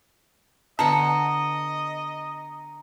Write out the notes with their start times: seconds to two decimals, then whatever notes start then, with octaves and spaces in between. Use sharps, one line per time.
0.79 D3 B3 D#5 F#5 A5 A#5 C#7